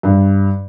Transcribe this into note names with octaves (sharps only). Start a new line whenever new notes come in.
G2